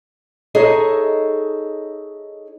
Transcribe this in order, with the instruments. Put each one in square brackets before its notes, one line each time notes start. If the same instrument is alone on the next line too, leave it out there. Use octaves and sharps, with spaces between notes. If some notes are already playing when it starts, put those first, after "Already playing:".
[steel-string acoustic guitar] D#4 G#4 A4 C#5 D#5 E5